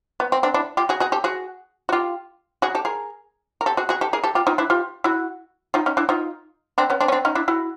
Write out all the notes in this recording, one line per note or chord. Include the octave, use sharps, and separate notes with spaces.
B3
C4
C4 D4
D4 E4
F4 G4
F#4 G#4
F#4 G#4
G4 A4
F#4 G#4
F#4
F4 G4
F#4 G#4
G4 A4
G#4 A#4
A#4
G4 A4
F#4 G#4
F#4 G#4
G4 A4
G#4 A#4
G4 A4
F4 G4
D#4 F4
D4 E4
F4 G4
E4 F#4
D#4 F4
C#4 D#4
D4 E4
D#4 F4
C4 D4
B3 C#4
C4 D4
C#4
C4 D4
C#4 D#4
D4 E4
E4 F#4